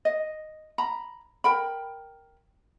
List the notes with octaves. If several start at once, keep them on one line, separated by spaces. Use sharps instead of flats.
D#5
A#5 B5
A#4 G5 B5